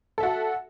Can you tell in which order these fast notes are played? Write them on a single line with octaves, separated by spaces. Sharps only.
A4 E5 F#4 F#5